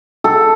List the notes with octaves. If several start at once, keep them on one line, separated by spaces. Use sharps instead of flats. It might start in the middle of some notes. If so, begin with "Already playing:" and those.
A4